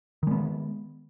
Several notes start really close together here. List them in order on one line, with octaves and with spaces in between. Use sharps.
D#3 G#3 B3